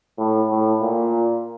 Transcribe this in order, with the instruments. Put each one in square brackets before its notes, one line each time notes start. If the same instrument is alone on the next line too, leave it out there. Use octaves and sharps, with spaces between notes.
[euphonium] A2
A2
A#2